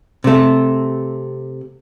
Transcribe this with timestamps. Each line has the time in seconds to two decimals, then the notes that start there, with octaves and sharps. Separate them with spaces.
0.24 C3 A3